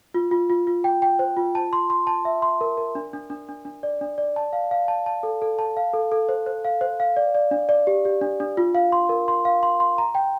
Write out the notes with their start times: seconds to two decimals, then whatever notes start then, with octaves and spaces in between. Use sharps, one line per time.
0.14 F4
0.31 F4
0.50 F4
0.67 F4
0.84 G5
1.02 G5
1.19 C5
1.37 F4
1.55 A5
1.73 C6
1.90 C6
2.07 A5
2.25 E5
2.42 C6
2.61 A#4
2.77 A#4
2.95 D4
3.13 D4
3.30 D4
3.49 D4
3.65 D4
3.83 D5
4.01 D4
4.18 D5
4.36 A5
4.53 F5
4.71 F5
4.88 A5
5.06 A5
5.23 A4
5.42 A4
5.59 A5
5.77 F5
5.93 A4
6.12 A4
6.29 C5
6.46 C5
6.65 F5
6.81 C5
7.00 F5
7.17 D5
7.35 D5
7.51 D4
7.69 D5
7.87 G4
8.05 G4
8.21 D4
8.40 D4
8.57 F4
8.75 F5
8.92 C6
9.09 A#4
9.28 C6
9.45 F5
9.63 C6
9.80 C6
9.98 A#5
10.15 G5